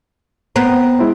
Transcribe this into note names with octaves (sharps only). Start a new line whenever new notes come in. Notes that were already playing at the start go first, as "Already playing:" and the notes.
B3 C4 A#5
G#3 E4 C5